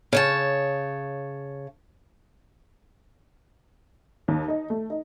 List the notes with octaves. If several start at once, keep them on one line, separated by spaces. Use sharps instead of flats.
C#3 C#5 A5
D#2
D#4
A3
D#4